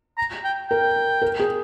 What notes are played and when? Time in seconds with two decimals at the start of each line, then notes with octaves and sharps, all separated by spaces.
0.18 A#5
0.44 G5
0.70 A#4 G5
1.22 A#4
1.40 G#4